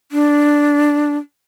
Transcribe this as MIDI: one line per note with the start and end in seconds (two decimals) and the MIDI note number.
0.12 1.17 62